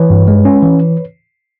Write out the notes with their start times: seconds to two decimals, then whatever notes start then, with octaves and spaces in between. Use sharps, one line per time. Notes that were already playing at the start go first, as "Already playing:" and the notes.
Already playing: E3 B4 C#5
0.10 G2
0.28 G#3
0.45 C#4
0.63 E3